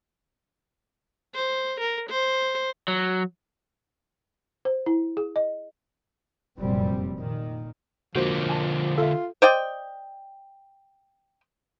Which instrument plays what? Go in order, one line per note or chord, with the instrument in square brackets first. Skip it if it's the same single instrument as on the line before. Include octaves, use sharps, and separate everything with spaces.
[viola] C5
A#4
C5
[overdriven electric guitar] F#3
[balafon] C5
E4
G#4
D#5
[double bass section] F1 F#2 A#2 G3 C4
A#2 D#3
[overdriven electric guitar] D3 A#3 [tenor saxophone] F3 [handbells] F#4 C5
[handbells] G#5 A5
[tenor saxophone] F4 [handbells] A4 E5
[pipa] C5 D5 D#5 G5